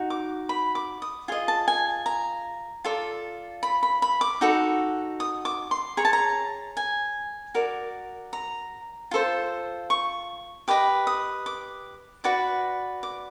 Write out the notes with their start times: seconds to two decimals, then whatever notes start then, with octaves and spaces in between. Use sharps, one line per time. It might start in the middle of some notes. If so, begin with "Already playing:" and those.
Already playing: D#4 F#4
0.10 D6
0.49 B5
0.75 D6
1.02 D#6
1.28 F4 G#4 D#5
1.48 A5
1.68 G#5
2.06 A#5
2.84 F4 A4 D5
3.63 B5
3.83 B5
4.02 B5
4.21 D6
4.41 D#4 F#4 A4
5.20 D#6
5.45 D6
5.71 C6
5.97 G#4 C#5 A#5
6.05 A5
6.13 A#5
6.77 G#5
7.54 F#4 A#4 D5
8.33 A#5
9.11 F4 A4 C5
9.90 C#6
10.68 G4 B4 D#5 D6
11.07 D#6
11.46 D6
12.24 F#4 B4 D5 D6
13.03 D6